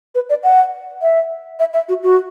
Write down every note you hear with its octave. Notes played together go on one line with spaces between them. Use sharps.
B4
D5
F#5
E5
E5
E5
F#4
F#4